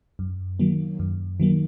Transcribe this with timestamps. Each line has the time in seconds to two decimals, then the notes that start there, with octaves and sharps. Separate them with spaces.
0.19 F#2
0.59 D#3 F#3 A#3
0.99 F#2
1.40 D#3 F#3 A#3